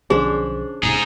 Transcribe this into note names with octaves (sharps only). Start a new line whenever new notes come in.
B1 D3 F3 C#4 D4 G#4 C5
D#1 G#2 C3 D#4 G#4